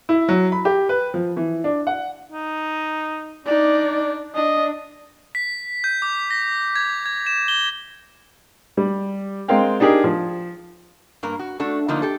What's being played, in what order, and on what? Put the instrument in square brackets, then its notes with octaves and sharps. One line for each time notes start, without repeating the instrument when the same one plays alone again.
[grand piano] E4
F#3
B5
G4
B4
F3
E3
D4
F#5
[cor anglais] D#4
[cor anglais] D4 [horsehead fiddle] D#4 D5
[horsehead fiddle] D4 [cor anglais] D#5
[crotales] B6
G6
D6
A#6
G#6
G#6
E7
G7
[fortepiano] G3
G#3 C4 A#4 F5 G5
D4 D#4 G4 G#4 A#4
F3
[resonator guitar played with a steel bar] G2 A#3 A#4
F#4
A3 D4 F#4 A4
D3 F3 A3 A#3 D#4
G4 A4